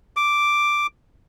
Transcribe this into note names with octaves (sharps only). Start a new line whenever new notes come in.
D6